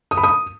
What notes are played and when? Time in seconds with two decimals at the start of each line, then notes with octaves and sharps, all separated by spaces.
0.11 D#6
0.17 B5
0.24 D#6